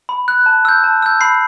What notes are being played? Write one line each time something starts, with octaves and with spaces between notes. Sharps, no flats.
B5
F#6
A5
E6 G6
A5
E6 G6
B5 C7